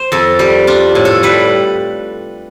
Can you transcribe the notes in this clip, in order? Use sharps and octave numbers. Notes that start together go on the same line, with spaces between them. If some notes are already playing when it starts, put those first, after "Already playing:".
Already playing: C5
F2 A4
G3 G4
D4 F4
A2
A4
G3 B4